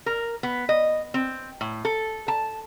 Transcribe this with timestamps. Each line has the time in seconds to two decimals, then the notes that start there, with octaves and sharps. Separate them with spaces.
0.06 A#4
0.43 B3
0.69 D#5
1.14 C4
1.61 A2
1.85 A4
2.28 A5